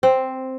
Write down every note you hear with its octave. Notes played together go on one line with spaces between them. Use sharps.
C4